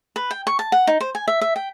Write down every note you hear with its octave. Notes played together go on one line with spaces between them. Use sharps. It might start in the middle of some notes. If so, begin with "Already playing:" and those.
B4
G5
C#6
A5
F#5
D#4
C5
G#5
E5
E5
G5